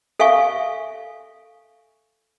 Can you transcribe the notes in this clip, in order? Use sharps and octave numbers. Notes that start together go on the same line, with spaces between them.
A4 E5 F5 G#5 C#6